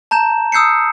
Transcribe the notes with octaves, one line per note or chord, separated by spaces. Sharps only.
A5 A#5 G6 E7
D#6 E6 G6 C7 C#7